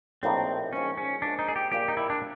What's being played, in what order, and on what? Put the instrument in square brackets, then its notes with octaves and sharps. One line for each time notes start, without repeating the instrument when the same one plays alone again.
[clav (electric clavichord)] A#1 A2 F3 A#3 D#4 [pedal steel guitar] C4
[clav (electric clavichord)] A#1 G#2 F3 [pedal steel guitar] C#4
[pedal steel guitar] C#4
[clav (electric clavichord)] G#2 F3 A#3 [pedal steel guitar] D4
[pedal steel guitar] D#4
G#4
G4
[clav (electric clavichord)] A#1 A#2 G3 A#3 [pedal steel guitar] G4
[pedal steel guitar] D#4
E4
D4